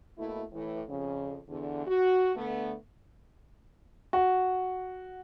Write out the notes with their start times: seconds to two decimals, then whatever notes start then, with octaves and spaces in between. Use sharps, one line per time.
0.18 B2 A3 A#3 E4
0.53 A2 E3
0.89 F2 C#3
1.49 E2 D3
1.87 F#4
2.35 D3 A3 B3
4.13 F#4